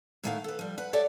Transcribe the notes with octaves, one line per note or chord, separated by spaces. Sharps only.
A2 D#3 A3 C#5 F5 F#5
A4 B4
F3 G3
B4 F#5
G4 A4 C#5 D5 E5 F#5